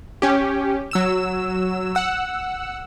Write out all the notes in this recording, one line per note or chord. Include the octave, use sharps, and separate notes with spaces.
C#4 G4
F#3 E6 E7
F#5 E6